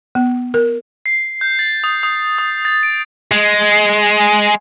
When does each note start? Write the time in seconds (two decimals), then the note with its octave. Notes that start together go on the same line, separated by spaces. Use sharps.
0.15 B3
0.54 A#4
1.06 C7
1.41 G6
1.59 A6
1.84 D#6
2.03 D#6
2.38 D#6
2.65 A6
2.83 D7
3.32 G#3